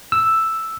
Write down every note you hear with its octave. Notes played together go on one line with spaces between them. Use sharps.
E6